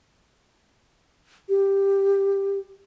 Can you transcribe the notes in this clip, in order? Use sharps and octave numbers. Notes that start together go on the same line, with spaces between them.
G4